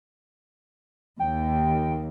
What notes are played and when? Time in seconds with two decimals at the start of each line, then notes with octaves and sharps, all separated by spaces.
1.20 D#2 G5